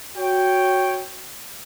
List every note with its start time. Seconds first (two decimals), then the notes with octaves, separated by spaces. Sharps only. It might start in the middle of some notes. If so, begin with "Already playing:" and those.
0.17 F#4 C#5 G5